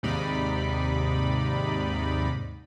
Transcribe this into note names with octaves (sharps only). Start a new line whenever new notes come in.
D#2 G#2 C3 D#4 D5 B5